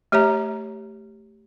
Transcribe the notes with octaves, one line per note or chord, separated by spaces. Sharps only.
A3 G4 C#5 E5 A#5